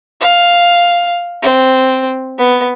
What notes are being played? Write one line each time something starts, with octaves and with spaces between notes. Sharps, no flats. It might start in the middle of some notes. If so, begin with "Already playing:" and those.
F5
C4
B3